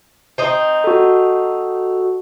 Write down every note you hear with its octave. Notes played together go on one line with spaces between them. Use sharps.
C4 D#4
F#4 A4